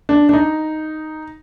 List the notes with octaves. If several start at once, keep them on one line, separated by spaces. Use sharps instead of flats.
D4
D4
D#4